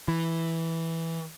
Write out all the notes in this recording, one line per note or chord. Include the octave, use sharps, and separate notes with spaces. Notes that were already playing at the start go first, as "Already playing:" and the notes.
E3